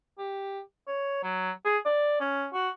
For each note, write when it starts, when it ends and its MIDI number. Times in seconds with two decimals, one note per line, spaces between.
0.18 0.60 67
0.87 1.21 73
1.23 1.51 54
1.65 1.78 68
1.85 2.20 74
2.21 2.48 61
2.53 2.69 66